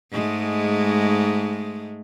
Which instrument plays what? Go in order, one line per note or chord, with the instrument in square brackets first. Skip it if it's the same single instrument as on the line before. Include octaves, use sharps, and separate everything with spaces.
[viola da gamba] G#2 G#3 A3